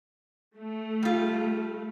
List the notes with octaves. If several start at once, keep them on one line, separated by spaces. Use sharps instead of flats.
A3
G3 F4